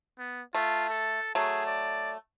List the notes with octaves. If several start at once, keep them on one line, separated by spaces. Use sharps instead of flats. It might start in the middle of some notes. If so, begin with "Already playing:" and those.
B3
A3 F4
A4
F#3 A3 G#4
D5